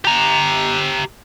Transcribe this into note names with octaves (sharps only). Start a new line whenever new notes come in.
G4 A#5